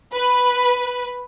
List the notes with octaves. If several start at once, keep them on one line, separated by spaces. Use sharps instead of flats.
B4